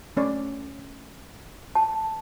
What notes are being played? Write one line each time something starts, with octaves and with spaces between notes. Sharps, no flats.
A3 C#4 D5
A5